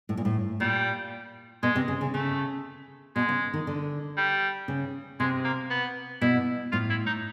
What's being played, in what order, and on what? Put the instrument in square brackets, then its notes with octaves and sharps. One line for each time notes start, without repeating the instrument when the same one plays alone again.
[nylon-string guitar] A2
A#2
A2
[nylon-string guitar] A#2 [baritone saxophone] G3
[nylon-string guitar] B2 [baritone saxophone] G#3
[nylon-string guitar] C3
C#3
C#3
[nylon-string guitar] C#3 [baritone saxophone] A3
[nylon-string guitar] B2 [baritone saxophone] G#3
[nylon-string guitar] C#3
D#3
D3
[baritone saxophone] G3
[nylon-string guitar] C#3
[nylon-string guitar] C3 [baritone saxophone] G#3
[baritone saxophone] A#3
B3
[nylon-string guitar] B2 [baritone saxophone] E4
[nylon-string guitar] A2 [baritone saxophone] F4
[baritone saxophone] E4
D#4